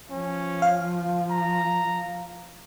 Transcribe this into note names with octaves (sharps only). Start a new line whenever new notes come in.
F3 C#4
F5
A#5